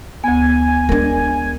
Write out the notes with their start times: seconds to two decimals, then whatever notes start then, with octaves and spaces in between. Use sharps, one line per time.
0.24 D2 B3 G#5
0.89 G#3 D4 A#4